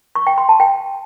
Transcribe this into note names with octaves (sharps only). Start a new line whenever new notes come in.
C#6
G5
C6
A5
G5